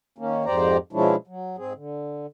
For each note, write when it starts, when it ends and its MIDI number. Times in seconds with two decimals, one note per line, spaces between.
0.18 0.45 51
0.18 0.45 58
0.18 0.45 61
0.45 0.77 41
0.45 0.77 44
0.45 0.77 67
0.45 0.77 72
0.45 0.77 74
0.45 0.77 82
0.93 1.16 47
0.93 1.16 53
0.93 1.16 56
0.93 1.16 61
0.93 1.16 62
0.93 1.16 64
1.27 1.56 54
1.58 1.73 44
1.58 1.73 60
1.58 1.73 68
1.75 2.26 50